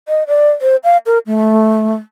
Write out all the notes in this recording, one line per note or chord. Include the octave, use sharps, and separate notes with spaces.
D#5
D5
C5
F5
A#4
A3